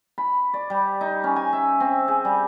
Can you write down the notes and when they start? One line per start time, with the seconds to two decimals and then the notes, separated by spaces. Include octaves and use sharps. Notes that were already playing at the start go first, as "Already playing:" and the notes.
0.18 B5
0.54 D5
0.70 G3
1.01 D#4
1.24 C#4
1.36 G#5
1.53 E5
1.80 C4
2.08 G#4
2.25 G3